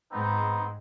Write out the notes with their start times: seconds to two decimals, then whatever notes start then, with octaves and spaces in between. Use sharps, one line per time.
0.12 G#2 B3 C4 D#4